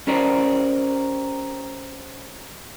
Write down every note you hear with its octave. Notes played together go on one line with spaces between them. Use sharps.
C#4 G4 A#4 C5 D5